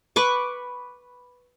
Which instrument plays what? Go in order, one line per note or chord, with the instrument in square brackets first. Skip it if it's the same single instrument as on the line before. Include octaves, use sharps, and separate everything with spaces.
[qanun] B4 C#6 D6